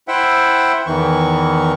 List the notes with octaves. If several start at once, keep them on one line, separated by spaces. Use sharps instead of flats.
E4 C5 E5 F#5 G5
E2 D#3 E3 C#6